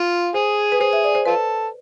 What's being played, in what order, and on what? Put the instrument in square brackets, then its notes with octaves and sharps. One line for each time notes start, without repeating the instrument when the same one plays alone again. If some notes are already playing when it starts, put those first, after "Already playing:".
Already playing: [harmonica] F4
[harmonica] G#4 [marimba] C5
[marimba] B4
[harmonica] G#4 [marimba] C5
[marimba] E5
D5
C5
[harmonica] F4 A4 [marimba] B4